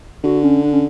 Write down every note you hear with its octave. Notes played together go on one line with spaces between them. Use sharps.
D3 F#4
C#4
D4
C#4